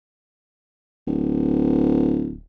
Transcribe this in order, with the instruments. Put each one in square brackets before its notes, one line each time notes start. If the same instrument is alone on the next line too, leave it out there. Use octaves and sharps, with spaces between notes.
[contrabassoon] D1